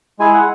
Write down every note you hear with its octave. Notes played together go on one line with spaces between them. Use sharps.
G#3 E4 G#4 G#5
F#5